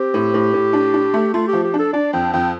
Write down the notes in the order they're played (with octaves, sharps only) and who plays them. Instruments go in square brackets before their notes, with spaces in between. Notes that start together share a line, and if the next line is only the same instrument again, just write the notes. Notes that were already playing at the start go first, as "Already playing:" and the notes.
Already playing: [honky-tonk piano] C4 [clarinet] G4
[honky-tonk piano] A2
A2
A2
D4
D4
A3
[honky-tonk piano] A3 [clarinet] F4
[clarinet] G4
[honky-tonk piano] F3
[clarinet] G4
[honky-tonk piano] D4
[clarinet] A4
[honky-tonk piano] D4 [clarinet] D5
[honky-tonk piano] F2 [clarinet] G5
[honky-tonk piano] F2 [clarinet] G5